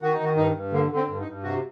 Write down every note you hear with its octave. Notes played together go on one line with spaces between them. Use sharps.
D#3 F#4
D#4
D#3 F#4
G2 D#4
G2
D3 A#3
D3
C4
G2
D#4
G2
C3 F#4